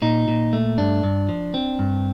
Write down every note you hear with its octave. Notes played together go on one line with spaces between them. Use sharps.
A#2 D#4
A#2
A3
G2 D4
G2
F3
C4
G2